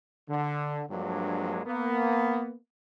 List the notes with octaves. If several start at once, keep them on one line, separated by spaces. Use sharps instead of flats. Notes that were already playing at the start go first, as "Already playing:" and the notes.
D3
G2 F3 F#3 G#3 A#3 D4
A#3 B3